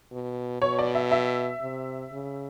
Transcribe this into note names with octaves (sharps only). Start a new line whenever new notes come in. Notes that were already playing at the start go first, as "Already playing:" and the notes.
B2
B2 C#5
D5
E5
E5
C3
C#3